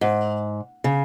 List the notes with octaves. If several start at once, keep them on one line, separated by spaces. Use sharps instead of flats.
G#2
C#3